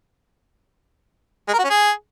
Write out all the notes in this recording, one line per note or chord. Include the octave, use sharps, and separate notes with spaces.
G#3
A#4
F#4
C#4
G#4